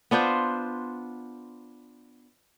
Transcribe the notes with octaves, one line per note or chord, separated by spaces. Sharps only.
B3 D4 F4 C5